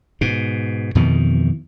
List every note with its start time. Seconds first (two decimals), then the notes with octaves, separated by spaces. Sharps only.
0.21 G#2 B2
0.95 F2 B2 D#3 E3